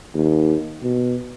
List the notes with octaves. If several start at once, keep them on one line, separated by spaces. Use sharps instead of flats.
D#2
B2